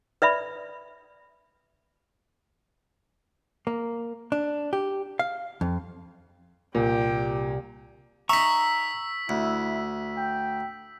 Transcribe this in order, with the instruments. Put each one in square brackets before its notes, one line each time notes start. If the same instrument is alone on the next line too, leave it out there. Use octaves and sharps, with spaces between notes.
[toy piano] B4 D5 E5 B5
[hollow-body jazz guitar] A#3
D4
G4
F5
F2
[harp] C2 [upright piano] A#2 [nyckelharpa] G4 G5
[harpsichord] D#4 E5 [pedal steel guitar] A#5 C#6 [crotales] E6 B6
[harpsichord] D2 [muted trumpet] E4
[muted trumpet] G5